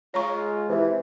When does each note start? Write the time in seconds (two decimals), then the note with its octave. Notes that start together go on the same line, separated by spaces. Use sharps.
0.14 G#3 F4 C#5 A#5 C#6
0.69 C3 E3